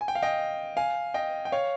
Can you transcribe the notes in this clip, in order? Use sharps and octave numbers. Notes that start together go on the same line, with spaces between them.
G#5
G5
F5
D#5 G5
F5 G#5
D#5 G5
G5
C#5 F5